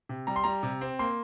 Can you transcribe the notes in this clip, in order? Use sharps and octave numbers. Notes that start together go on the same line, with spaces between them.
C3
G3 A#5
C6
G3 A#5
C3
C4
A#3 C6